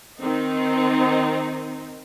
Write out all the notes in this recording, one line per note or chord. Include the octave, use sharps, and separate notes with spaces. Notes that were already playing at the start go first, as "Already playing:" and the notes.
D#3 C4 D#4